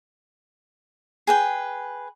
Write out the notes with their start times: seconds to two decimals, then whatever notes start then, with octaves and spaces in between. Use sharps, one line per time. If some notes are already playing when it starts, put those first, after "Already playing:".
1.27 G#4 B4 G5